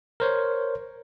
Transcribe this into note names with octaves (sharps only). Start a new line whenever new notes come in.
A#4 C5 C#5